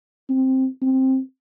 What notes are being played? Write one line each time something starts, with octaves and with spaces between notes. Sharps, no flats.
C4
C4